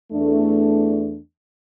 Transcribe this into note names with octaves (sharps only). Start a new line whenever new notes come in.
E2 A3 D4